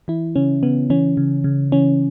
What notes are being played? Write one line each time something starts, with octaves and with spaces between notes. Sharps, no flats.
E3 E4
C#3 C#4
C#3 B3
E3 C#4
C#3
C#3
E3 C#4